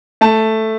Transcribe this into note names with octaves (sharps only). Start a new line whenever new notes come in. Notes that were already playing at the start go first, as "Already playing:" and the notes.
A3 A5